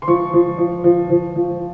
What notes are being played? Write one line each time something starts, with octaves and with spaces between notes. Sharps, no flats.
C6
F3 C#6
F3
F3
F3
F3
F3